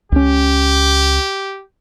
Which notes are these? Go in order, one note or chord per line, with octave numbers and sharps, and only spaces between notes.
C#2 C#4 G4